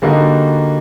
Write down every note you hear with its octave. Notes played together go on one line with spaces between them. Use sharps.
D3 G3 A#3 D#4 F#4